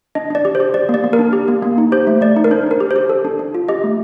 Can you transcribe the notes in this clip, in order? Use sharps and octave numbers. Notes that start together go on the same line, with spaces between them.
D4 D#5
D4 D5
G4
C5
G4
G4 D5
A#3
D5
A#3
A#4
D4
G4
A#3
A#3
D#4
G4 C5
A3
A3 D5
D#4
A#4
D4 C5
D4 A#4
G4
C5
G4
A4
D4
D4
F4
G4 D#5
A3